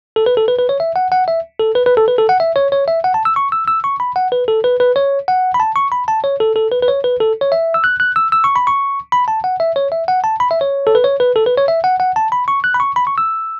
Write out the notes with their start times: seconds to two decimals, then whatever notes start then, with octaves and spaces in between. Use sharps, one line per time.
0.16 A4
0.26 B4
0.37 A4
0.48 B4
0.59 B4
0.69 C#5
0.80 E5
0.96 F#5
1.12 F#5
1.28 E5
1.60 A4
1.75 B4
1.86 B4
1.97 A4
2.08 B4
2.18 A4
2.29 F#5
2.40 E5
2.56 C#5
2.72 C#5
2.88 E5
3.04 F#5
3.14 A5
3.25 E6
3.36 C#6
3.52 E6
3.68 E6
3.84 C#6
4.00 B5
4.16 F#5
4.32 B4
4.48 A4
4.64 B4
4.80 B4
4.96 C#5
5.28 F#5
5.54 B5
5.60 A5
5.76 C#6
5.92 B5
6.08 A5
6.24 C#5
6.40 A4
6.56 A4
6.72 B4
6.82 B4
6.88 C#5
7.04 B4
7.21 A4
7.41 C#5
7.52 E5
7.74 E6
7.84 F#6
8.00 F#6
8.16 E6
8.32 E6
8.44 C#6
8.56 B5
8.67 C#6
9.12 B5
9.28 A5
9.44 F#5
9.60 E5
9.76 C#5
9.92 E5
10.08 F#5
10.24 A5
10.40 B5
10.51 E5
10.61 C#5
10.87 A4
10.95 B4
11.04 C#5
11.20 B4
11.36 A4
11.46 B4
11.57 C#5
11.68 E5
11.84 F#5
12.00 F#5
12.16 A5
12.32 B5
12.48 C#6
12.64 F#6
12.74 B5
12.80 C#6
12.96 B5
13.07 C#6
13.18 E6